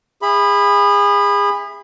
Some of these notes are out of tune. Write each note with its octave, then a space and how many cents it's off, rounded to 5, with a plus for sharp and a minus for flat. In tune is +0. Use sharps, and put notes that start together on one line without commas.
G#4 -30 E5 +0 B5 +5